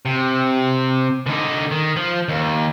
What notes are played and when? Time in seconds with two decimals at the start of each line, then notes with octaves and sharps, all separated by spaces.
0.05 C3
1.26 D3 D#4
1.71 D#3
1.96 F3
2.28 D#2